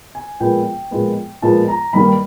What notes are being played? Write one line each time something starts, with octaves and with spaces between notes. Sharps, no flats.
G#5
A#2 F3 G#3 B3 G5
A#2 F3 G#3 B3
A#2 F3 G#3 B3 A5
A#5
G2 D#3 G3 A#3 B5